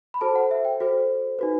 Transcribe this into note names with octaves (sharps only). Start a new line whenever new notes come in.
B5
F#4 A4 C5 A5
F#5
E5
G5
F#4 A4 C5
D#4 F#4 B4